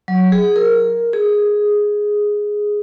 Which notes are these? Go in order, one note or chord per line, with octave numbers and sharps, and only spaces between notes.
F#3
G#4
A#4
G#4